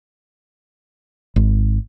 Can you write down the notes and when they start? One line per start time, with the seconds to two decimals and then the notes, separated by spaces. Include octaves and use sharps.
1.36 G#1